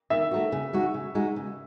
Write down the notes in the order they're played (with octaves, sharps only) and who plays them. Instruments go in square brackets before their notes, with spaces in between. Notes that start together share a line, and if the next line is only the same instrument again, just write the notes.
[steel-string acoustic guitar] D#3 [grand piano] E5
[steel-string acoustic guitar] A3 D#4 F#4
C#3
G#3 D#4 F#4
C#3
G#3 D#4 F#4
C#3